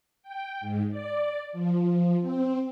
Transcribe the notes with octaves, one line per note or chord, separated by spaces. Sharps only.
G5
G#2
D5
F3
C4